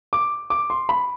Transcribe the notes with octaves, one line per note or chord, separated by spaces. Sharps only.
D6
D6
C6
B5